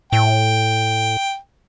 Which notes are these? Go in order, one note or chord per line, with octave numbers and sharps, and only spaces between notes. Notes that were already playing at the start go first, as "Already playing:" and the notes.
A2 G5